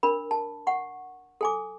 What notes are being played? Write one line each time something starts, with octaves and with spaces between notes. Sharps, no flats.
D4 A#4 B5
A5
F#5 C#6
A4 G#5 D6